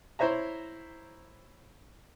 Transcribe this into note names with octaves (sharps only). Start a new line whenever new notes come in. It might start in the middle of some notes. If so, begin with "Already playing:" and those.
E4 C5 C#5 E5 A#5